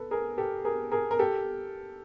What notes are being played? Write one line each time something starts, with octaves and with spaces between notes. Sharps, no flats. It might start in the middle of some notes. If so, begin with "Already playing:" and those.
Already playing: A4 B4
G#4 A#4
G4 A4
G#4 A#4
G#4 A#4
A#4
G4 A4